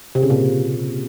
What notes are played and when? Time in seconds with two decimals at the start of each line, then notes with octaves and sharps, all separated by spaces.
0.15 C3
0.23 C#3
0.30 A#2